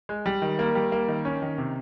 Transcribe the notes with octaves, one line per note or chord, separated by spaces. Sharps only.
G#3
G3
D#3
A#3
G3
A#3
D#3
C#4
D#3
C3